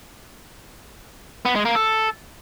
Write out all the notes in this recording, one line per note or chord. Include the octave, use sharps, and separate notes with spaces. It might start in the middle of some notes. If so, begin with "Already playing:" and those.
B3
G#3
A#3
A4